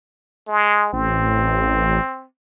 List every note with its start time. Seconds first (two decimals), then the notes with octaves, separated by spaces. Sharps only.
0.48 G#3
0.93 A1 C4